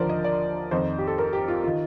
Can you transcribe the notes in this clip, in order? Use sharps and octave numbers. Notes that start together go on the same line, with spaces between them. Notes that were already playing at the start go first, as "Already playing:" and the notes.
Already playing: D#2 D3 F3 A#4 C5 D5
D#5
D5
F2 D#3 C5
G4
A4
A#4
G4
F4
D#3 F4